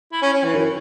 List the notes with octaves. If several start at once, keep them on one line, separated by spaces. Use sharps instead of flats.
E4
C#4
C#4
E3
F#2